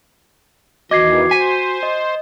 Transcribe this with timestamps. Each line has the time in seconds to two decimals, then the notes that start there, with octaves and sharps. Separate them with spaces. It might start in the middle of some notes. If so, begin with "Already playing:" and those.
0.91 E2 D#3 E3 F#4 D#5 D6 G#6 C7
1.31 C5 G#5 B6
1.83 D#5